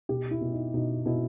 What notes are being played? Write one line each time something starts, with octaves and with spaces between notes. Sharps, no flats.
B2 G4
E4
B2
D#4
B2 D#4
B2 E4